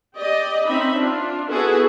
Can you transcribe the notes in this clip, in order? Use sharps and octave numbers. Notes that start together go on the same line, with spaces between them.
G4 D5 D#5
C4 C#4 D#4 E5 B5
D4 F4
B3 E4 F#4 G#4 A4 B4